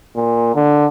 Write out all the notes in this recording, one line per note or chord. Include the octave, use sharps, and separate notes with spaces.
A#2
D3